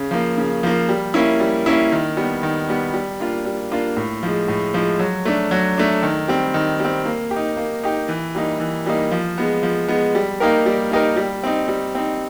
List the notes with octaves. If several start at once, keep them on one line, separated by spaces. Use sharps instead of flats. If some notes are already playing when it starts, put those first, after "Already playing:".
Already playing: C#3
F3 A#3
C#3
F3 A#3
G3
A#3 C#4 E4
G3
A#3 C#4 E4
D#3
G3 B3
D#3
G3 B3
G3
A#3 D4 F4
G3
A#3 D4 F4
A2
F3 G#3
A2
F3 G#3
F#3
A3 D4
F#3
A3 D4
D#3
G3 C4
D#3
G3 C4
A#3
G4
D#4
A#3
D#4 G4
E3
G3 A#3 D#4
E3
G3 A#3 D#4
F3
G#3 B3
F3
G#3 B3
G3
A#3 D#4 G4 A#4
G3
A#3 D#4 G4 A#4
G3
C4 D#4
G3
C4 D#4